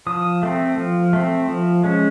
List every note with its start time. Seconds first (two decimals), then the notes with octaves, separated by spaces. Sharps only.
0.07 F3 D#6
0.43 A3 C4
0.77 F3
1.13 A3 C4
1.48 F3
1.84 G#3 C#4